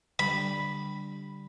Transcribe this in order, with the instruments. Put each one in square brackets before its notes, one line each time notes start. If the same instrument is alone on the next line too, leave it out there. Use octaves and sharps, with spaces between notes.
[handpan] D3 G3 G4 [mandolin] B5